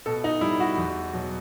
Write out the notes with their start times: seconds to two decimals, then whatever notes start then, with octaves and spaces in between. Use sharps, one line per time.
0.06 B2 A4
0.24 D#4
0.41 G3 E4
0.60 F#4
0.78 E2
1.13 B2 F#3